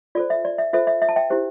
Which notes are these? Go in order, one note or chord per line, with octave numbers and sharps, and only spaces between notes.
F4 A4 C5 D5
E5
D5
E5
F4 A4 C5 E5
E5
E5
A5
E5 G5
E4 G4 C5